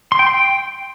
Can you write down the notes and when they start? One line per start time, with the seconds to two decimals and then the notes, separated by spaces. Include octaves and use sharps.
0.12 C6
0.19 G5
0.27 C6
0.34 G5